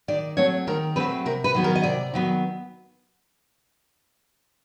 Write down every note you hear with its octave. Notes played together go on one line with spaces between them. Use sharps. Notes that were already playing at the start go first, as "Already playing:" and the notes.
D#3 D5
F#3 A3 C4 C#5
D#3 A#4
F#3 A3 C4 B4
C3 A#4
B4
D#3 F#3 B3
A#4
D#5
C3 D5
D#3 F#3 B3